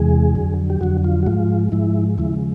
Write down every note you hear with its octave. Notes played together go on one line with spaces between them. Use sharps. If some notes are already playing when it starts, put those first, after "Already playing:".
Already playing: E2 C3 E3 G#3 G#4
F2 D3 F#3
G4
F2 D3 F#3 F#4
F4
F#4
G#2 F3 G#3 F4
G#2 F3 G#3 E4
D#2 C#3 F3 G#3 E4